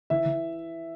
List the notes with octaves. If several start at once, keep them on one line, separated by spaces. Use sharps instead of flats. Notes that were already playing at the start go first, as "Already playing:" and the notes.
E3 E5
E3